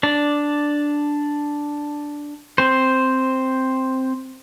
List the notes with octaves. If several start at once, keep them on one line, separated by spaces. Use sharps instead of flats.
D4 D5
C4 C5